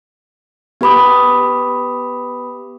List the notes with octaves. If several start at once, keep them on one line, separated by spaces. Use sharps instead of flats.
B3 G4 B4 B5 D6 D#6